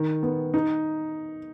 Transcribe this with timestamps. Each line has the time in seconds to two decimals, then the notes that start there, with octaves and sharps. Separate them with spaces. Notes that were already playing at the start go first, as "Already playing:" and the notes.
Already playing: D#3
0.23 B3
0.54 D#4